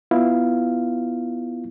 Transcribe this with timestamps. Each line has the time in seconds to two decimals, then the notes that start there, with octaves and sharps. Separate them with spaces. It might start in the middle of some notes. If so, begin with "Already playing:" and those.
0.11 B3 E4 F4 F5